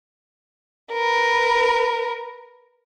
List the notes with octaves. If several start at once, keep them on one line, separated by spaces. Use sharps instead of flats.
A#4 B4